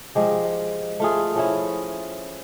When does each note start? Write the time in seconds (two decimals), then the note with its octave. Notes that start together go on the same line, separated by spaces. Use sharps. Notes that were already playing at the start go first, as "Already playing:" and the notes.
0.15 F3 G#3 G4
1.00 A3 F4 G#4
1.36 F3 C#4 E4